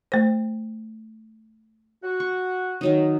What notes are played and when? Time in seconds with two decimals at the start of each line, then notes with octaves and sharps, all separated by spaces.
0.12 A3 C5
2.04 F#4
2.20 C#6
2.81 D#3 F#3 D#4